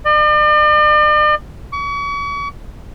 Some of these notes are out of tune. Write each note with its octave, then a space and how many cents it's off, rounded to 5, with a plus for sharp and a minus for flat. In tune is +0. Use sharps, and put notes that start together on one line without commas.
D5 +45
C#6 +40